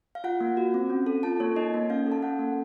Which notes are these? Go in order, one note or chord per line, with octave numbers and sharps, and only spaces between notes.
F5
F4 F#5
A#3
F#4
C4
C#4
A4
F4 A5
A#3 C#5
D#4 D#5
A#3
C#4 F5
A4
A5
C#4 F#5
A#3